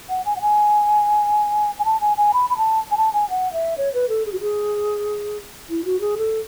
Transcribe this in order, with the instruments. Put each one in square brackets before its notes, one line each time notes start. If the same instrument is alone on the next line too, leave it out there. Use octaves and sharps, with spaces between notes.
[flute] F#5
G#5
F#5
G#5
G#5
A5
G#5
G#5
B5
B5
A5
G#5
A5
G#5
F#5
E5
C#5
B4
A4
G#4
F#4
G#4
E4
F#4
G#4
A4